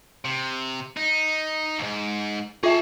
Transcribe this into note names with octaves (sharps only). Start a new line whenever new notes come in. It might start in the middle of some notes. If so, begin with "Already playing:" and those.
C3
D#4
D#2 G#2
F4 G#4 E5 A5